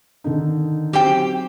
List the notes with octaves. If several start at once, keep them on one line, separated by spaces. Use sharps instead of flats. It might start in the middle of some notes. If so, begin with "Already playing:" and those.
D3 D#3 D#4
F#3 C4 G4 C5 G5